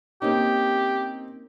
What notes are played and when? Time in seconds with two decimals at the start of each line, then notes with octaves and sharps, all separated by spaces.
0.22 A#3 C4 C#4 D#4 G4